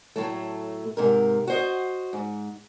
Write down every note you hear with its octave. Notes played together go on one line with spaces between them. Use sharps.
A2 F#3 A3
G#2 C3 A#4
F#4 C5 D#5
G#2